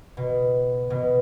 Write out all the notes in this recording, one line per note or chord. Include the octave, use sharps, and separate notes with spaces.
B2
B2